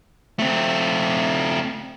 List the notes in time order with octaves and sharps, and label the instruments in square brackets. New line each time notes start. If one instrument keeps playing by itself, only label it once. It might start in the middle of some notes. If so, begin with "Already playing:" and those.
[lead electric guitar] A3 C4